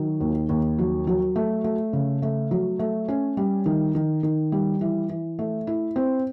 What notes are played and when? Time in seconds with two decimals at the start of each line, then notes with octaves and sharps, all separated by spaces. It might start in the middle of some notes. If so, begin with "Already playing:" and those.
Already playing: D#3 F#3
0.21 D#2
0.49 D#2
0.78 F#3
1.07 F#3
1.36 A3
1.64 A3
1.93 C#3
2.22 A3
2.51 F#3
2.79 A3
3.08 C#4
3.37 G3
3.66 D#3
3.95 D#3
4.23 D#3
4.52 G3
4.81 E3
5.10 E3
5.39 A3
5.67 E4
5.96 C4